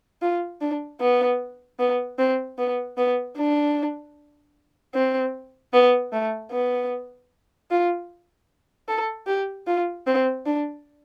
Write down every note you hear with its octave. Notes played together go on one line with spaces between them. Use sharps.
F4
D4
B3
B3
C4
B3
B3
D4
C4
B3
A3
B3
F4
A4
G4
F4
C4
D4